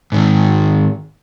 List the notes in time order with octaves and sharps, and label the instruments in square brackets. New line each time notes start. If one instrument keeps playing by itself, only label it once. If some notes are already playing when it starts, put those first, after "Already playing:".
[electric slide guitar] G#2 D#3